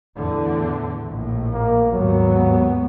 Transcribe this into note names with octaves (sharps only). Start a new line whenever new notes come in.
E2 A2 D3
A#1 A2
A#3
D#2 G#2 F#3 B3